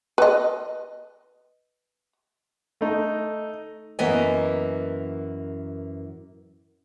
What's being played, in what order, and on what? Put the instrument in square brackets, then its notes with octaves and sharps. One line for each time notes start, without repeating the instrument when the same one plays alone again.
[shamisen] B4 D#5
[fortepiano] A3 D#4
[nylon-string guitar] F#2 E3 A#3 B3 D#5 G#5